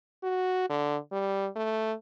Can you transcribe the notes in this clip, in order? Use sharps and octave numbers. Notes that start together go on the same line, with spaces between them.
F#4
D3
G3
A3